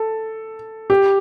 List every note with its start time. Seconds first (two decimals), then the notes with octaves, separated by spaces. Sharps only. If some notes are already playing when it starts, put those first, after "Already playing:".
Already playing: A4
0.90 G4